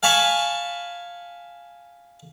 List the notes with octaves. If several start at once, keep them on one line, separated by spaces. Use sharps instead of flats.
F5 G#5 A5 B5 C#6